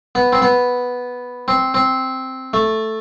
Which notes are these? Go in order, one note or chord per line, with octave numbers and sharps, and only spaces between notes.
B3
C4
B3
C4
C4
A3